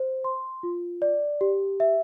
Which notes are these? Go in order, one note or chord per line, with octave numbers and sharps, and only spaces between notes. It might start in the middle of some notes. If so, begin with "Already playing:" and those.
Already playing: C5
C6
F4
D5
G4
E5